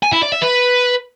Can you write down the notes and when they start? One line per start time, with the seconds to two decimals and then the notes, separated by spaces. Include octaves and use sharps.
0.03 G#5
0.12 E4
0.22 D5
0.32 E5
0.42 B4